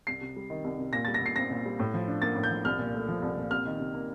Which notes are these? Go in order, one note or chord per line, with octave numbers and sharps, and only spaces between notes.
C2 C7
C3
G3
D#3
C2
C3
A#2 A#6
A6
G3
A#6
A#2 C7
C4 A#6
A#2
G3
A2
F3
D4
A#3 A6
A2
G6
F3
C2 F6
A#2
A3
F3
C2
A#2
C3 F6
D#3
C3
A#3